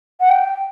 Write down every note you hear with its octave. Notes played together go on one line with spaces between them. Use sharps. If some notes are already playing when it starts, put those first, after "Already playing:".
F#5
G5